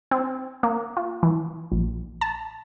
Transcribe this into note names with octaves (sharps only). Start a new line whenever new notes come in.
C4
A#3
F4
E3
A#1
A5